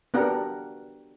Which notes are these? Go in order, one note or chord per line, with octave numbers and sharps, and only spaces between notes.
B3 D4 F#4 G4 A#4 F#5